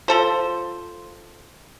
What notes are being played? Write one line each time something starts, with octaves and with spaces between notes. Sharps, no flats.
F3 A4 C5